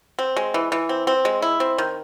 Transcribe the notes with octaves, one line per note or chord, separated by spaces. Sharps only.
C4
G#3
E3
E3
C4
C4
G#3
E4
C4
D#3